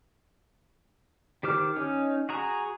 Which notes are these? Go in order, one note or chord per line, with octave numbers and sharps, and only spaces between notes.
D#3 G4 C5 D6 F6
C#4 D#4
F#4 G#4 A#5